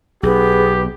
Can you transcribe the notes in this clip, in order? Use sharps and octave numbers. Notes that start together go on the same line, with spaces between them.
B1 B3 G4 G#4